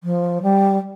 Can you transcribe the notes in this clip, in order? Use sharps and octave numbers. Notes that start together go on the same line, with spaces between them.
F3
G3